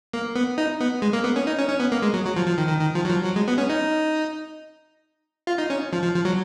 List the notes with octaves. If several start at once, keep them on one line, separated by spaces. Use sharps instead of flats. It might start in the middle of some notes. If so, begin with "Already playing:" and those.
A#3
B3
D#4
B3
G#3
A#3
B3
C#4
D#4
C#4
C#4
B3
A#3
G#3
F#3
F#3
F3
F3
D#3
D#3
D#3
F3
F#3
F3
F#3
G#3
B3
C#4
D#4
F4
D#4
C#4
F3
F3
F3
F#3